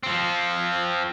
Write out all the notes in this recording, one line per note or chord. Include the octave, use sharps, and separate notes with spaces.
F3 C4